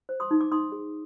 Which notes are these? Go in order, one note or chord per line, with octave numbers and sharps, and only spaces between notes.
C5
C6 D#6
D#4
D6
D#4 C6 D#6
G#4